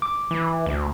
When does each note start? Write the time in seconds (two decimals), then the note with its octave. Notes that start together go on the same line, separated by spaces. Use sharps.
0.02 D6
0.31 E3
0.66 D2